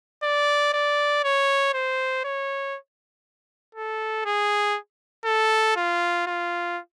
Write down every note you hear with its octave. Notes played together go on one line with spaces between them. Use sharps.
D5
D5
C#5
C5
C#5
A4
G#4
A4
F4
F4